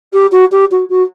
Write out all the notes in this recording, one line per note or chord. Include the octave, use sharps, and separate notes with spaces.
G4
F#4
G4
F#4
F#4